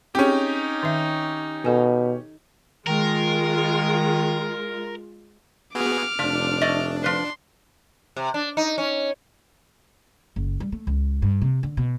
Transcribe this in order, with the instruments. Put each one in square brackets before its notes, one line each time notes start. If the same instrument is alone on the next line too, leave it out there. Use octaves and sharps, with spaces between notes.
[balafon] C4 G#4 [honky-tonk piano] C#4 G4 [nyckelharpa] D#4
[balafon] D#3 E5
[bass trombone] B2 [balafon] A4 G#5
[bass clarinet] D#3 [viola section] G#3 F4 [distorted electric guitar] A#4
[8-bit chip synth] B3 F#4 G#4 [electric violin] D6 F6
[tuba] F1 [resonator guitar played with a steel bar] F3 [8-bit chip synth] D4
[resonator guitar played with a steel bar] A3 D5 D#5
[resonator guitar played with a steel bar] F3 B4 [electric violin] C6
[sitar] C3
D4
D#4
C#4
[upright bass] F#1
G3
A3
C#2
G2
C3
D3
B2